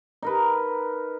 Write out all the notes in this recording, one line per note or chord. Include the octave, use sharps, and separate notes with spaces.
D#4 A#4 B4